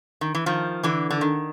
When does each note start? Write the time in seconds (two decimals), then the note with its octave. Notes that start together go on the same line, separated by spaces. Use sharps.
0.21 D#3
0.35 E3
0.46 D#3 F3
0.83 D3 E3
1.10 D3
1.21 D#3